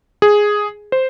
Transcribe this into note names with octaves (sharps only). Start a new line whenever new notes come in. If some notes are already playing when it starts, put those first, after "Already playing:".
G#4
C5